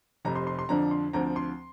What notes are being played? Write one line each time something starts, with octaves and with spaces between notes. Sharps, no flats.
F1 F2 C3 A#5
C6
C6
C6
F2 D3 F3 D4 A#5
C6
D2 D3 F3 C4 A#5
C6